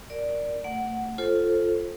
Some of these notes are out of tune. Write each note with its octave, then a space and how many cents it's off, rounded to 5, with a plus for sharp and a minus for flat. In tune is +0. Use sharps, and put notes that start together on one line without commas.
A#4 +0 D5 +0
A3 +30 F#5 +0
F4 +0 A4 +0 C5 +20